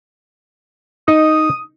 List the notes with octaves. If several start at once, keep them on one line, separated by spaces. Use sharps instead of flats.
D#4 D#6